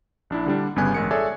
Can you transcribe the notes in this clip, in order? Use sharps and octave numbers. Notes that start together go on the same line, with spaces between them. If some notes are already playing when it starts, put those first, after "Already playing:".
A#1 D4 E4
D3 G3 D4
G1 G2 C#3 B3 G#5 F#6
A1 G#3 A#4 C#7
G#4 A4 C#5 D5 E5 G#5